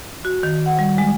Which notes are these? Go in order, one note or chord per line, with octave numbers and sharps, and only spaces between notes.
F#4
D#3
F#5
G3
G#3